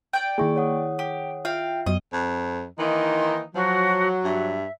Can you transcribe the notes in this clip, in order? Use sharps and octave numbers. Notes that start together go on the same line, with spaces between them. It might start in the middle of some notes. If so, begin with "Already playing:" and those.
D5 G5
D#3 A#3 E4 G#4 C#6 D7
C#5 F#5 D#6
G4
F4 E5 F5 G5 C7
F#2 F#3 B3 D#5
F2
D#3 E3 A#3 D#4 C6
F3 F#3 F#4
G2 E5